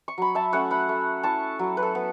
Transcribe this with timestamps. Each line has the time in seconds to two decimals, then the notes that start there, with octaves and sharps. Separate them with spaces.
0.08 C#6
0.18 F#3 B5
0.35 E5 A5
0.53 A3 C#4 C#5 F#5
0.71 F#5 B5
0.89 A3
1.23 E4 A5 C#6
1.59 F#3
1.77 B4
1.83 A4
1.95 B3